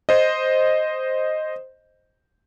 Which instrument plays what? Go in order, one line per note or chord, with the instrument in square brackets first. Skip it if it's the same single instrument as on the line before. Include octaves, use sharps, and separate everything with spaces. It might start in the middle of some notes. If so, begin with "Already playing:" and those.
[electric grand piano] C5 D#5